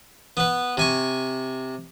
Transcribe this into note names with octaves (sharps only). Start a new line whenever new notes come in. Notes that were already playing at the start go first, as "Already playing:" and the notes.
B3 B4
C3 G#5 C#6